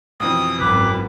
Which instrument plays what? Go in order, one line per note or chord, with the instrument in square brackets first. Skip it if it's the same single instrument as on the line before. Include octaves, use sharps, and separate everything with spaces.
[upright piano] B1 F2 E3 [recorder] D#6
[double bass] G#1 F#2 [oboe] B4 [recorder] D6